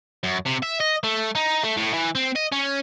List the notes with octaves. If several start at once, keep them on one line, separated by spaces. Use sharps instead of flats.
F#2
C3
E5
D#5
A3
D#4
A3
A2
E3
C4
D#5
C#4